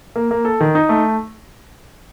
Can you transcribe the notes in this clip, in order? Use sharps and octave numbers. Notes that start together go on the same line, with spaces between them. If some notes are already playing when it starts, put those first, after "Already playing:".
A#3
A#3
A4
D#3
D#4
A3